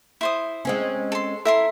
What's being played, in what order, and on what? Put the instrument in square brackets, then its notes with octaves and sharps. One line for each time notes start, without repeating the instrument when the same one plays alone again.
[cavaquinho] E4 C5 D#6
[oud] G#3 C4 C#4
[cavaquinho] A4 C6
[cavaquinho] E4 A#4 C6 [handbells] A4 E5